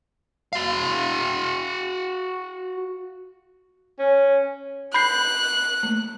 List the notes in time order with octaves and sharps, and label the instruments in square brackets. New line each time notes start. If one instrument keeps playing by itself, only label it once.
[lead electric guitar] F#4 F5
[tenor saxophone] C#4
[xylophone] B5 G6 C7 [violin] F#6
[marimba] A3 A#3